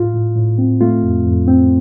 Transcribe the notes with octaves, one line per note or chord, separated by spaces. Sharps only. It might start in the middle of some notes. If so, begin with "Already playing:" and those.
Already playing: A2 F4
A2
A2
C4
A3 F4
F2
F2
C4